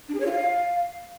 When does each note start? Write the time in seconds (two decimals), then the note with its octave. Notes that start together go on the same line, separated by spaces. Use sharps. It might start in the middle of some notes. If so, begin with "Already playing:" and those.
0.09 D4
0.14 G#4
0.20 C#5
0.26 F4
0.32 F5